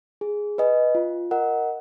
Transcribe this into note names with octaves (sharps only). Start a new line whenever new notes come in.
G#4
B4 D#5 G#5
F4
A#4 D#5 F#5